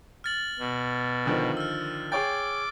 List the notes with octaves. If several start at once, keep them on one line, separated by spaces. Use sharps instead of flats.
F6 A6 F#7
B2
D3 D#3 F3
E6 F6
G#4 C#5 G5 D6 A6